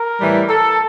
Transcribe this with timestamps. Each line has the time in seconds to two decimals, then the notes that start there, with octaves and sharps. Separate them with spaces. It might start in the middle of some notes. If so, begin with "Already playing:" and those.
Already playing: A#4
0.21 A2 E3 G3
0.50 A4